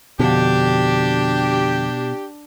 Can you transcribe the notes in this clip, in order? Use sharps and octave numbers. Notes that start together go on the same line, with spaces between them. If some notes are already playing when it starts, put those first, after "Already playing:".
F2 B2 D3 D4 G4